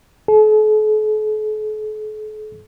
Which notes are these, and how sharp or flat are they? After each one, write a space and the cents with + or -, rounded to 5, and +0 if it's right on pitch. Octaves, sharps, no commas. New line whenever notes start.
A4 -45